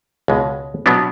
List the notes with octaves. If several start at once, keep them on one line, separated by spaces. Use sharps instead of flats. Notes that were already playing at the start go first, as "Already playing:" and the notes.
C#2 B2 G#3
B2 F#3 B3 D4